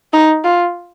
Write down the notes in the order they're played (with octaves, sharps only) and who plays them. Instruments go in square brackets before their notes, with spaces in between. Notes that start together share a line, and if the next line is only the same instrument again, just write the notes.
[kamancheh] D#4
F4